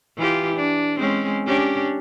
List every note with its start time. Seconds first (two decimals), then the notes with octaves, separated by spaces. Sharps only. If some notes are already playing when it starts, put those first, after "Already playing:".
0.17 E3 F4 G4
0.55 D4
0.98 G#3 C4 C#4
1.47 C#4 D4 G4